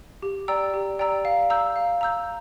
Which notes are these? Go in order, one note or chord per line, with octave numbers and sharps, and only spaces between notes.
G4
D5 G5 A#5 E6
G4
D5 G5 A#5 E6
F5
A#5 E6 G6
F5
A#5 E6 G6